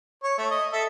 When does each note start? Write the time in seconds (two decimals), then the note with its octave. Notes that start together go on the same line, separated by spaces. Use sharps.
0.23 C#5
0.38 A3
0.51 D#5
0.73 A4 E5